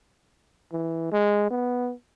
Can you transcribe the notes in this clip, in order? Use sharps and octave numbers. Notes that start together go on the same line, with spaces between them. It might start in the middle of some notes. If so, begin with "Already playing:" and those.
E3
G#3
B3